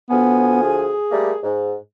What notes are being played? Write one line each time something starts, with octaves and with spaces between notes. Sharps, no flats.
D2 F3 B3 G#5
G#4
G3 A3 A#3
G#2